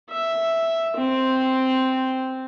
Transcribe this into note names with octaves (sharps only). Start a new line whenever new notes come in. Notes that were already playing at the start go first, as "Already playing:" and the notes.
E5
C4